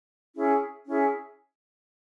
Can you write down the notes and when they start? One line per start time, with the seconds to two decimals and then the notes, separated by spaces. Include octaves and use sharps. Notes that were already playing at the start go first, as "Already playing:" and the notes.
0.36 C#4 E4 G#4
0.86 C#4 E4 G#4